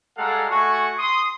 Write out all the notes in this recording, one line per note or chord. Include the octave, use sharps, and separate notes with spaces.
G3 G#3 A4 F5 F#5 A#5
A3 F#4 G#5 C#6
C6 D#6